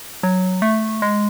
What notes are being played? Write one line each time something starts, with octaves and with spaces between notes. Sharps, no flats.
F#3
A3
G#3